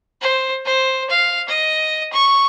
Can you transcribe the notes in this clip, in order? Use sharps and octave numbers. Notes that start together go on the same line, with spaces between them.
C5
C5
F5
D#5
C#6